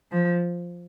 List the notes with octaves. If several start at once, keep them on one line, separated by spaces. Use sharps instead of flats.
F3